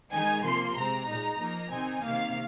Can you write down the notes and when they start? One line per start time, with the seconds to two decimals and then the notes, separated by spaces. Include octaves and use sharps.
0.13 D#3 G#3 D#4 G#5
0.45 C3 F3 A#3 C6
0.77 C3 G#3 C4 A#5
1.08 A#2 G#3 D#4
1.40 F3 A#3 D#4
1.72 C3 D#3 C4 D#4 G#5
2.03 C3 D#3 A#3 F5